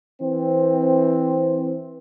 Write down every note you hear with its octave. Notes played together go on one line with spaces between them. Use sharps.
E3 C4